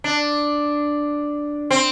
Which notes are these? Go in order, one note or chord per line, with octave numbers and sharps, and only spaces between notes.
D4
C4